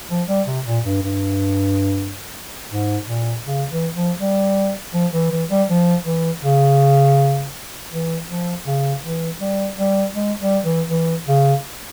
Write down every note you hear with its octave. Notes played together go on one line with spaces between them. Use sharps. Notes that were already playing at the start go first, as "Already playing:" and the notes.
F3
G3
C3
A#2
G2
G2
G#2
A#2
C#3
E3
F3
G3
F3
E3
E3
G3
F3
E3
C#3
E3
F3
C#3
E3
G3
G3
G#3
G3
E3
E3
C#3